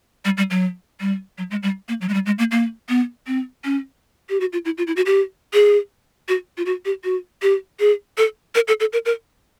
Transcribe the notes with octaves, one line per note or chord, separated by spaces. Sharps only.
G3
G3
F#3
G3
F#3
G#3
G3
A#3
F#3
G#3
G3
G#3
A#3
A#3
B3
C4
C#4
G4
F#4
F4
E4
F4
E4
F#4
G4
G#4
F#4
F4
F#4
G4
F#4
G4
G#4
A4
A#4
A4
A4
A#4
A#4